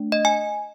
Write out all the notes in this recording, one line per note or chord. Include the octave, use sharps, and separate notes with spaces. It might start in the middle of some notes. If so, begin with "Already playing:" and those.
Already playing: A3 D4
D#5
G#5